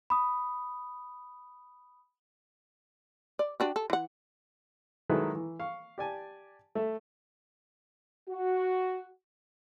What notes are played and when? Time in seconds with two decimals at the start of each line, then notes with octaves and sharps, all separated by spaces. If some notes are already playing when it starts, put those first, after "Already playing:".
0.10 B5 D#6
3.39 D5
3.60 D4 F#4 G4
3.76 A4
3.90 E3 F#5
5.10 D#3 F#3 G#3 E4 A4 B4
5.35 E3
5.60 F5 C#6
5.98 G4 D5 G#5 A5
6.75 A3 E5
8.30 F#4